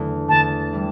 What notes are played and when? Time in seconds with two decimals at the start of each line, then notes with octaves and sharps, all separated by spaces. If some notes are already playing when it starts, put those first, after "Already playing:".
Already playing: E2 D3 A3
0.28 E2 D3 A3 A5
0.73 E3 G3